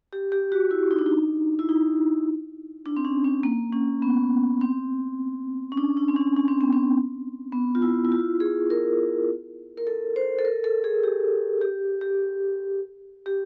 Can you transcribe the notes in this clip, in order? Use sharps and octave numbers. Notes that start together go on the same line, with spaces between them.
G4
G4
F#4
E4
D#4
D4
D#4
E4
D#4
D4
C4
C#4
C4
A#3
C#4
B3
C4
C#4
D4
D4
C4
C#4
C#4
C4
B3
C4
B3
F4
E4
E4
F4
G#4
A#4
A#4
A4
C5
A4
A#4
A4
G#4
G4
G4
G4
G4